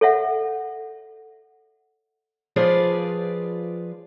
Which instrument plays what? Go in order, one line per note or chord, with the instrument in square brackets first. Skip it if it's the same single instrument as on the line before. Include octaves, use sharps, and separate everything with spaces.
[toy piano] A4 C#5 E5 F#5
[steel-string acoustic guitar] F3 F4 G#4 B4 D5